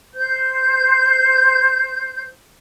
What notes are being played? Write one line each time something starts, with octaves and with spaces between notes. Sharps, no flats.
C5 G6